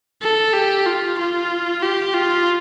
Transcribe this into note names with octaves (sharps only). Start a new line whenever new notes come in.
A4
G4
F4
F4
G4
F4